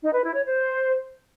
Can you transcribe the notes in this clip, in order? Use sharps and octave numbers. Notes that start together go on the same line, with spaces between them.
D#4
B4
E4
C#5
C5